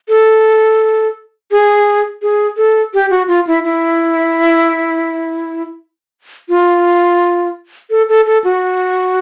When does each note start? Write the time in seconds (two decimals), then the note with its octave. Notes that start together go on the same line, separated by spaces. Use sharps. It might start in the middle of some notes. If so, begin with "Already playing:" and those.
0.09 A4
1.51 G#4
2.22 G#4
2.57 A4
2.94 G4
3.10 F#4
3.28 F4
3.47 E4
3.64 E4
6.49 F4
7.90 A4
8.09 A4
8.26 A4
8.44 F#4